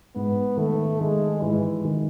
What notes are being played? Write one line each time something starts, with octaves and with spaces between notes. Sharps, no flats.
G#2 B3
D#3 A3
D#3 G#3
G#2 E3
D#3